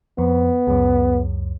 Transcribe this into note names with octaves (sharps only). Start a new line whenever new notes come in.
F2 B3
C#2 F#2